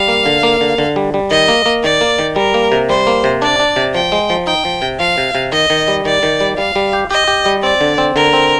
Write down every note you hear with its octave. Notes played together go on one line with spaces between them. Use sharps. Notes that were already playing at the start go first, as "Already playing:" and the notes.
Already playing: G3 F5
A#3
D3
A#3
D3
D3
G3
G3
D#3 D#5
A#3
A#3
D#3 D5
A#3
D#3
G3 A#4
A#3
C3
G3 C5
A#3
C3
D4 D5
D4
C3
F3 G5
G#3
F3
D#4 G5
F3
C3
F3 F5
C3
C3
D#3 D#5
D#3
G3
D#3 D5
D#3
G3
G3 F5
G3
G4
G4 D#5
G4
G3
C4 D5
D3
C4
D3 A#4
C4